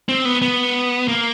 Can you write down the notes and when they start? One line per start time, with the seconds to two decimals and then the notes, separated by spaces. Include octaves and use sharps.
0.09 C4
0.25 B3
0.42 B3
1.08 A#3